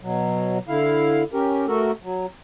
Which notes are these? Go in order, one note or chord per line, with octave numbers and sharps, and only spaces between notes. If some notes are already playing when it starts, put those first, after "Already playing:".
B2 F#3
D3 E4 F5
C#4 G4 A#4
A3 F#4 A4 A#4
F#3